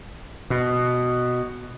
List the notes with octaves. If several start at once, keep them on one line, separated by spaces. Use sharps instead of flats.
B2